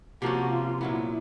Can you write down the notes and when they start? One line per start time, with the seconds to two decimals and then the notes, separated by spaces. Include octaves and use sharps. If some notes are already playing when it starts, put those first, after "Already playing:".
0.22 C3 F3 A#3 C#4 F#4
0.52 F4
0.81 A#2 F#3 B3 E4